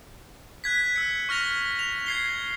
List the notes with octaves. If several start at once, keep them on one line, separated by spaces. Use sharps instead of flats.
F#6 G#6 B6
E6 C#7
C#6 F6 A#6 F7
F7
G#6 C7 G7